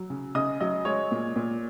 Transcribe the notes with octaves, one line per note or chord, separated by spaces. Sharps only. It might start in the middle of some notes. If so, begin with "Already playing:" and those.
Already playing: F#3
C#3
C#3 D#5 D#6
F#3 D#5
G#3 C#5
A#2
A#2